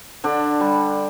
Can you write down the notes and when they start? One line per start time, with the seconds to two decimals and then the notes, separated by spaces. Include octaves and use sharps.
0.24 D3 D4
0.60 G3